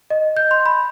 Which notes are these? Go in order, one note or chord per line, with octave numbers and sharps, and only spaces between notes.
D#5
G6
C6
B5